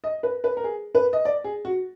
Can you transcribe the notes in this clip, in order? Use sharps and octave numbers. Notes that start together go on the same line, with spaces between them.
D#5
B4
B4
A#4
G#4
B4
D#5
D5
G#4
F#4